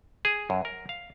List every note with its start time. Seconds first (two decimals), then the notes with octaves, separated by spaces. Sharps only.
0.25 G#4
0.50 F#2
0.65 A#4
0.89 F5